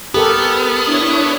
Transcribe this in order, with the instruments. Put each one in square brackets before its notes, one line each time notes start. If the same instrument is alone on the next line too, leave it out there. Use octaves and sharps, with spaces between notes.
[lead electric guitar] B3 [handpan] G4 A4 A#4
[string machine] D4 E4 C#5